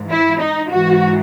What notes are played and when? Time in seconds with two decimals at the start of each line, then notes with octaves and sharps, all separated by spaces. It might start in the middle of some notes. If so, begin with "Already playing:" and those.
Already playing: G#2 E3
0.10 E4
0.39 D#4
0.69 G#2 E3 F#4